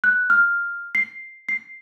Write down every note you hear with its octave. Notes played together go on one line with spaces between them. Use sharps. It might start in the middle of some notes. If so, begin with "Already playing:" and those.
F#6
F6
C7
C7